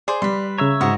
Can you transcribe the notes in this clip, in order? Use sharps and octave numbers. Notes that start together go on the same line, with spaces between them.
G#4 C5 D5
G3 B4 C6
C#3 C#5 E5 A#5
G#2 F#4 D#5